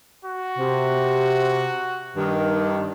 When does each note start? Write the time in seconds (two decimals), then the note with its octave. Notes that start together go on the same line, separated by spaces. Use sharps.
0.25 F#4
0.58 C3
2.16 G2 D#3